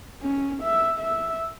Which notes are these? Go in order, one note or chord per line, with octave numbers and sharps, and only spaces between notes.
C#4
E5
E5